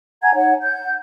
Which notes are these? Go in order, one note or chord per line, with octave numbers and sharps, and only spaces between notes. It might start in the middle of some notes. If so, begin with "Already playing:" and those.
F#5 G#5 A#5 G#6
D#4 C#5 F#5
F#5 G6